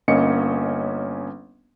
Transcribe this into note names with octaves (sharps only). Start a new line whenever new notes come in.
G1 A#3 C#4 C#5 D#5 C#7